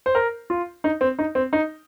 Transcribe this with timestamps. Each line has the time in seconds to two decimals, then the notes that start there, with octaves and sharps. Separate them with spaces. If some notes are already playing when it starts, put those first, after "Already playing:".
0.06 C5
0.15 A#4
0.50 F4
0.84 D#4
1.01 C4
1.19 D#4
1.35 C4
1.53 D#4